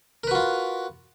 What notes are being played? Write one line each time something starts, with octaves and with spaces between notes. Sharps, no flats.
F4 F#4 A#4 B4